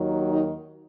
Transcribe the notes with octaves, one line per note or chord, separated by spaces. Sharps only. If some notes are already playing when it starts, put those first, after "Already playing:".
Already playing: D#2 D#3 F#3
D#4